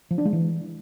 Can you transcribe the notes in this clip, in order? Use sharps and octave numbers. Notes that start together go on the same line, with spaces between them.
F3
D4
G#3
E3